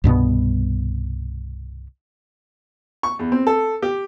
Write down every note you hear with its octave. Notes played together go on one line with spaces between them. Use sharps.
C2 G2 B2 B3
C#6
E2
C4
A4
G4